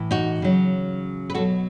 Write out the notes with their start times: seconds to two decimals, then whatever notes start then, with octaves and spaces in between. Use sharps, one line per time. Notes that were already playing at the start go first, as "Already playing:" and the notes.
Already playing: A2 E3
0.11 D#4 F#4
0.42 C#3 F#3
1.30 B4
1.34 B2 F#4 A4
1.38 F#3